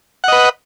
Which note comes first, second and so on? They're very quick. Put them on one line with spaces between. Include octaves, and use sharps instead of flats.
F#5 D#5 B4